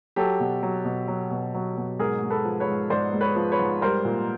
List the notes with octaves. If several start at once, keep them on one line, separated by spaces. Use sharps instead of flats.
F#3 G4 A4
B2
F#3
B2
F#3
B2
F#3
B2
G#2 G#4 A#4
G#3
A4 B4
F3
B4 C#5
G#2
G#2 C5 D5
G#3
B4 C#5
F3
B4 C#5
G#2
G3 A#4 C5
A#2